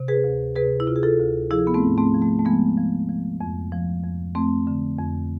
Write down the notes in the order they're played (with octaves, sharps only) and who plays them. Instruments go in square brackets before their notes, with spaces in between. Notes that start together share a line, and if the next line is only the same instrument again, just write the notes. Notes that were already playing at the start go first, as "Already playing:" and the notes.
Already playing: [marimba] C3
G#4 B4
D2
C3 G#4 B4
E4
C3 F4
G#4
F4 A4
D2
F3 E4 G#4
B3
A3 C4
G#2
A3 C4
F3
A3
A3
F3 G#3 B3
F3
F3
F2
F3
F2
F2 A3 C4
D3
F2